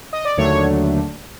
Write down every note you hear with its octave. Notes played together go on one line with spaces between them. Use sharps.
D#5
D5
D#2 D3 F#3 A3 D4 C#5